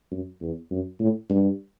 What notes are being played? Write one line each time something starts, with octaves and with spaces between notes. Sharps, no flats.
F#2
E2
F#2
A2
G2